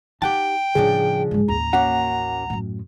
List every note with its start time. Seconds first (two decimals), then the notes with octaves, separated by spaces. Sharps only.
0.22 D#4 G4 F#5 G5 A5
0.75 A2 C#3 F3 G3 D4 G#4
1.31 G#2 G#3
1.48 A1 D#2 A#5
1.73 A#3 C#4 F#4 F#5
2.50 F#2 A2